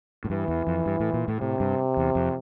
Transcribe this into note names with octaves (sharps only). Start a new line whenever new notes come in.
A2
G2 E3
E2
F2
G2
A2
A#2
A2
A2 C3
G2
E2
F2